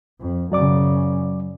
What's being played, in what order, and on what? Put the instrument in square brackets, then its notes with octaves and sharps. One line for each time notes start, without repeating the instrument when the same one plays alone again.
[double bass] F2
[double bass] F#2 C#3 [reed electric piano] F#3 D5 D6